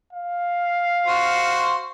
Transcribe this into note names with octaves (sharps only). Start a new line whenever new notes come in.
F5
F#4 C5